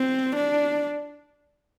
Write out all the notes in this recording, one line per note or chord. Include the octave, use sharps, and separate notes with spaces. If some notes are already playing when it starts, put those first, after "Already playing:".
Already playing: C4
D4